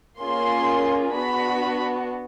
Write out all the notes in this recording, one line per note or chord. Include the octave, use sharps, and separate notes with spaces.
A#3 C#4 F4 G#4 C6
B3 D4 F#4 B5